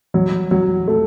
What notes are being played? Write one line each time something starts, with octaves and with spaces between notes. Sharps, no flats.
F#3
F#3
A3